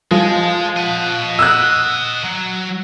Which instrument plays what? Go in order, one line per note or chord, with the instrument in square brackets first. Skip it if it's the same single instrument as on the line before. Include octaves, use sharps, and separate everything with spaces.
[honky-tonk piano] F3 [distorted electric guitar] G#3
[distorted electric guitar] D#5 F#5
[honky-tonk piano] E6 F#6
[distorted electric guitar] F#3